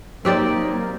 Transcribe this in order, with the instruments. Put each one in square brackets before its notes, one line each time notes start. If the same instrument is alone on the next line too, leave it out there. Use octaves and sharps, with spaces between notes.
[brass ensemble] F#3 D#4 [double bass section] A#3 [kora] C4 G4 D5